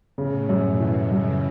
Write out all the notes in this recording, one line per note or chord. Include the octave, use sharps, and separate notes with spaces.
A2 C#3
F#2
B2
E3
F#2 C#3